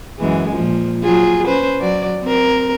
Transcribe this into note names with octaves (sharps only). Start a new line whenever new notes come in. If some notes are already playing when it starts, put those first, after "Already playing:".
F#2 E3 G#3
A#2 F3
F#3 F4 G#4
C#4 B4 C5
F#3 D5
C4 A#4